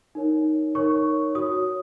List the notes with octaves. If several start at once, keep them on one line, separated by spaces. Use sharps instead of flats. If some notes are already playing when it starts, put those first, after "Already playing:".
D#4 A#4 C#5
D#4 A#4 C#5 C#6
F#4 C#5 D#6